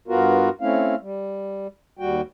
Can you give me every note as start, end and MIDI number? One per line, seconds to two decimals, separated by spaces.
0.08 0.49 43
0.08 0.49 59
0.08 0.49 65
0.08 0.49 66
0.08 0.49 70
0.61 0.95 57
0.61 0.95 60
0.61 0.95 61
0.61 0.95 64
0.61 0.95 77
1.02 1.67 55
1.99 2.21 39
1.99 2.21 55
1.99 2.21 66
1.99 2.21 79